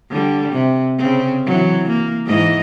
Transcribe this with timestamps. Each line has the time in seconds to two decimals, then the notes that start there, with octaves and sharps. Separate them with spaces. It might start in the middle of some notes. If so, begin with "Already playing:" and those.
0.10 D3 G3
0.53 C3
0.98 C#3 C4
1.46 E3 F#3
1.90 A#3
2.26 G#2 E3 D#5